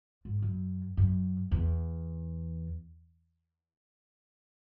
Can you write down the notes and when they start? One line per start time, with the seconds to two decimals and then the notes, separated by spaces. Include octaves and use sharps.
0.25 G#2
0.42 F#2
0.97 F#2
1.51 E2